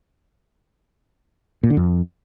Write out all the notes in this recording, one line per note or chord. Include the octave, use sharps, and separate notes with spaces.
A#2
D3
F2